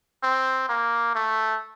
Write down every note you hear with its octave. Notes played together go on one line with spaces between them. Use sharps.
C4
A#3
A3